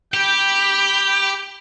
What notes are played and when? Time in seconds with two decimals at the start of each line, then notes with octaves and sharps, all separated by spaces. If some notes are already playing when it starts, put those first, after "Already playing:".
0.14 G4 G5 B5